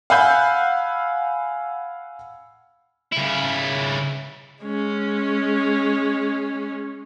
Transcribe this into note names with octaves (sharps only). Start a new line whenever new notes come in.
F5 F#5 G#5 B5 E6 G6
C#3 E4
G#3 C#4